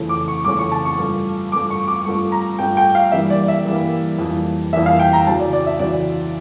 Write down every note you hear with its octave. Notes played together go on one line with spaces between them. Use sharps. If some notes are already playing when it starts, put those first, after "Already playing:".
Already playing: F2 C#3 E3 A3
D6
C#6
F2 C#3 E3 A3 D6
C#6
A5
C#6
G2 F3 A3
G2 F3 A3 D6
C#6
D6
G2 F3 A3 C#6
A#5
G2 F3 A3 G5
G5
F5
G2 E3 G3 A#3 E5
D5
E5
G2 E3 G3 A#3
F2 E3 G3 A#3
F2 E3 G3 A#3 E5
F5
G5
A#5
D2 C#3 E3 A5
D5
D5
E5
D2 C#3 E3 D5